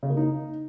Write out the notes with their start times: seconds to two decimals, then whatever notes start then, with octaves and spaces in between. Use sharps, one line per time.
0.03 C#3
0.10 A#3
0.17 D#4